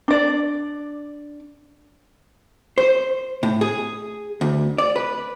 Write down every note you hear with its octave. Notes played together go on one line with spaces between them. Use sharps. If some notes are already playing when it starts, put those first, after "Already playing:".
D4 D5
C5
A2
G#4
D2
D5
B4